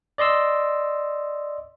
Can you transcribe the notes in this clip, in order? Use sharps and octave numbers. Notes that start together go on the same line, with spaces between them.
D5 D#5 C6 E6